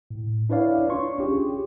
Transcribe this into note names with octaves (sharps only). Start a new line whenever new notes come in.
A2
D4 E4 B4 C#5 D5 F5
D4 F4 C#5 C6 C#6
C#4 G4 G#4